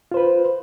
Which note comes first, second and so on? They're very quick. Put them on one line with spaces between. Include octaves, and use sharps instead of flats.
F4 C5 B4